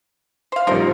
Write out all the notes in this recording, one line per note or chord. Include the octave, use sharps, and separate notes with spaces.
C5 F5
A1 F3 G3 D#4 A#4 C5